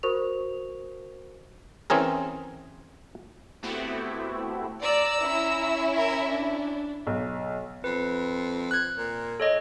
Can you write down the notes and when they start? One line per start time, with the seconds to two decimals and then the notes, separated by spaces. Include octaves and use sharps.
0.03 F#4 A#4 C5 C#6 F7
1.90 E3 C4 C#4 G#4 A#4
3.63 A3 B3 C4 E4 F#4 G4
4.83 D5 A#5 E6
5.21 C#4 E4
5.97 A#4 E5
6.30 D4
7.07 B1
7.84 F2 B4
8.71 F#6 G#6
8.97 A#2
9.40 A4 C#5 D#5